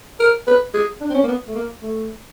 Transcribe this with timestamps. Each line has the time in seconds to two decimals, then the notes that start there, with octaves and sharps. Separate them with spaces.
0.20 A#4
0.47 B4
0.74 G#4
1.01 D4
1.10 C4
1.15 C#4
1.24 A#3
1.28 B3
1.48 A3
1.55 A#3
1.82 A3